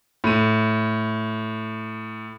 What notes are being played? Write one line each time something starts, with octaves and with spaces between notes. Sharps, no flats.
A2 D#7